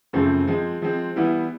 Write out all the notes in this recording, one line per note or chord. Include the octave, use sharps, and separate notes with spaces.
F#2 C#3 F3 A3 C4
F3 G#3 C4
F3 G#3 C4
E3 G3 B3 E4